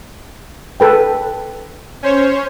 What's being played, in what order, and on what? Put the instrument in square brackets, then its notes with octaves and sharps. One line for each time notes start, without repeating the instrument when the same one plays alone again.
[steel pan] A4 B4 G5
[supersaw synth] C#4 C5 C#5